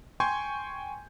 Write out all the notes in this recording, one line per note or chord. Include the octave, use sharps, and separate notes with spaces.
G5 G#5 C6 C#6 G6 G#6